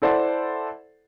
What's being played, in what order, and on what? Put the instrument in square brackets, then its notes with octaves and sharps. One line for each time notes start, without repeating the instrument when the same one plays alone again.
[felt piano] E4 A4 C5 D5 F#5